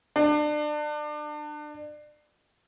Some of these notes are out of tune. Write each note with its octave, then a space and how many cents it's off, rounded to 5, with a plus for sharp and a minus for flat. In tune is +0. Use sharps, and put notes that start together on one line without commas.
D4 +30